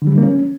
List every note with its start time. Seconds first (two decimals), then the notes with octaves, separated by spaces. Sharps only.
0.02 D3
0.07 G3
0.13 D3
0.18 A#3
0.23 C#4